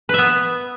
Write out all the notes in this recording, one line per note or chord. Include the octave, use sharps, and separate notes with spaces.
B3 B4 E5